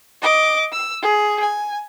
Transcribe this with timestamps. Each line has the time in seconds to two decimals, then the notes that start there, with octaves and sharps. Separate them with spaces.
0.22 D#5 D6
0.72 E6
1.02 G#4
1.40 G#5